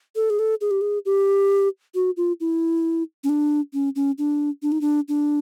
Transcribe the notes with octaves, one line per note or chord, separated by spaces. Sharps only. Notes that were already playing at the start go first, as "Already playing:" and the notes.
A4
G#4
A4
G#4
G4
G#4
G4
F#4
F4
E4
C#4
D4
C#4
C#4
D4
D4
D#4
D4
D4